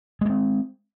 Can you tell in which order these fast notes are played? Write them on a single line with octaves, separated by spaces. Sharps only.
G#3 A#3 C4